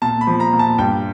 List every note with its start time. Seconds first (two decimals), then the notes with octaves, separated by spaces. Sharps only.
0.02 A#2 A5
0.21 B5
0.27 F3
0.40 A#5
0.53 A#2
0.59 A5
0.78 G2 G5